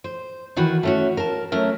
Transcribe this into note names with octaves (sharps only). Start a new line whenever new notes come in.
C5
D#3 E3 F#4 A#4 B4
A3 C#4 F#4
A#4 A5
F#3 A3 C#4 A#4